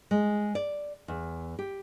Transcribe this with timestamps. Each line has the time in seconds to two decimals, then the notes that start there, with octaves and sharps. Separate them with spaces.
0.11 G#3
0.55 D5
1.08 E2
1.59 G4